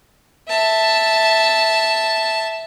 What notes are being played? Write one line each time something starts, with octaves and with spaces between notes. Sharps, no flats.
E5 A5